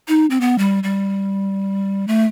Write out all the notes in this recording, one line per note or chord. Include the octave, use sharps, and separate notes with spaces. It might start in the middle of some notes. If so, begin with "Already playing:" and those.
D#4
C4
B3
G3
G3
A3